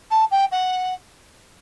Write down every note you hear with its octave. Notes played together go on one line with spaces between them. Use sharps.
A5
G5
F#5